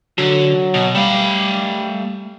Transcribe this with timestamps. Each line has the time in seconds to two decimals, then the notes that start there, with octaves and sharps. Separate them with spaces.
0.18 D3 F#3
0.74 B2
0.95 G3 A3 F5